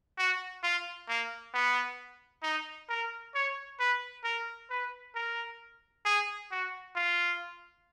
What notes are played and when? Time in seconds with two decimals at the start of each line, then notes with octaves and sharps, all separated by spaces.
0.18 F#4
0.63 F4
1.09 A#3
1.54 B3
2.43 D#4
2.89 A#4
3.35 C#5
3.80 B4
4.24 A#4
4.70 B4
5.15 A#4
6.05 G#4
6.51 F#4
6.96 F4